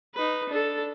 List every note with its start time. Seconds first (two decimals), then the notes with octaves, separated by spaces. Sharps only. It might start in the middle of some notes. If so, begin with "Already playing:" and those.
0.15 D#4 B4
0.49 D4 A4